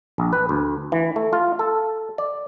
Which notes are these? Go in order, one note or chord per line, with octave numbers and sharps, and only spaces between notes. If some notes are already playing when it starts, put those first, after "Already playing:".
A#1
B4
D2
E3
A3
F4
A4
D5